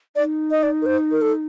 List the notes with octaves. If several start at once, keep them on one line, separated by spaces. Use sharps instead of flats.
D#4 D5
D#5
D5
A#4
C5
A#4
A4